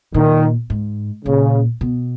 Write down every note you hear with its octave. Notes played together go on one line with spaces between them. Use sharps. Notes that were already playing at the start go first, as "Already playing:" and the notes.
A#2 D#3
G#2
A#2 C#3
B2